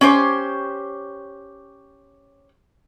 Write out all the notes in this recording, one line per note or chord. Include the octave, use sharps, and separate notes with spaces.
C#4 G4 C5